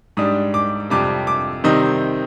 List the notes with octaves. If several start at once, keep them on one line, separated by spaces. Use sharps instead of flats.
G#2 G3 D4 D#6
D6
F2 C3 G3 D6
D6
C3 D#3 G3 C4 D#4 D#5